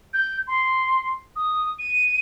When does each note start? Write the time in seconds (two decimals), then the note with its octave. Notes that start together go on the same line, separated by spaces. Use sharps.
0.13 G6
0.47 C6
1.35 D#6
1.78 D#7